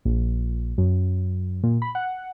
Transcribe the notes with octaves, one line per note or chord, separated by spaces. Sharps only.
A#1
F#2
A#2
B5
F#5